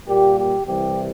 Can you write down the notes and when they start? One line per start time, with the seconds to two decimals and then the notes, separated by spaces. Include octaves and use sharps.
0.08 A#2 G3 A#3 G4
0.38 G4
0.67 C2 C3 E3 G3 G4